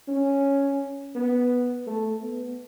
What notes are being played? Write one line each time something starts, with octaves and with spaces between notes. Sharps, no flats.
C#4
B3
A3
B3